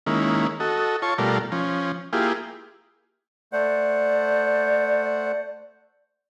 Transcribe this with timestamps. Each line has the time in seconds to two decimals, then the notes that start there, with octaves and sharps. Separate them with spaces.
0.06 D#3 G#3 A#3 C#4 E4
0.60 F#4 A4 D#5
1.02 F4 C#5 A5 C#6
1.18 B2 G3 A3 F4 A#4 D5
1.52 F3 C#4
2.13 A#3 E4 F4 G4 G#4
3.52 A3 C5 D5 F#5